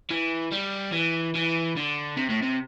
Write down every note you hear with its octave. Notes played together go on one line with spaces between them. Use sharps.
E3
G3
E3
E3
D3
C3
A2
C3